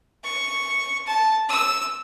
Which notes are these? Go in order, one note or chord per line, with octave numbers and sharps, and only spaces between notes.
C#6
A5
E6